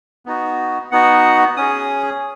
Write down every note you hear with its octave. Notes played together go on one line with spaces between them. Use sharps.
B3 D#4 F#4
B3 D#4 F#4 F#5
C#4 G#4 D#6